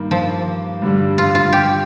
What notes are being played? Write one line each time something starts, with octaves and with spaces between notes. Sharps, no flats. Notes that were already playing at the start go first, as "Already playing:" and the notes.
Already playing: G2 D#3 A#3
F3
G2 D3 G3
F4
F4
G4